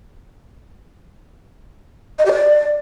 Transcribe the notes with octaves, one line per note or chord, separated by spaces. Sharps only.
D#5
G4
D5